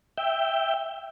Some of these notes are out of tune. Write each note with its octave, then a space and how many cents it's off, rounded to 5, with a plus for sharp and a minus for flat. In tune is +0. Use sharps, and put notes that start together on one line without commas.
E5 +0 G5 +0